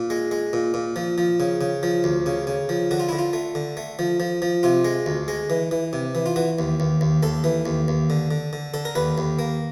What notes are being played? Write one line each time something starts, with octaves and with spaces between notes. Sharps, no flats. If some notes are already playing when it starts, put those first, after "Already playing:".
Already playing: A#2
G#3
G#3
A#2
A#2
F3
F3
C#3
C#3
F3
D2
C#3
C#3
F3
D3 F#4
F4
D3 E4
F4
A3
D3
A3
F3
F3
F3
C3 F4
G#3
D2
G#3
E3
E3
C3
E3
F4
E3 F#4
D#2
D#2
D#2
D#2 A4
E3
D#2
D#2
D3
D3
D3
D3 A4
A#4
D#2 B4
D#2
A#3